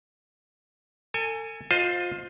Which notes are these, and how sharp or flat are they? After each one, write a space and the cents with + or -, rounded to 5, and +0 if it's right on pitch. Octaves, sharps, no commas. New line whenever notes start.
A4 +35 G#5 +0
F4 +25 C5 +0 D#5 +0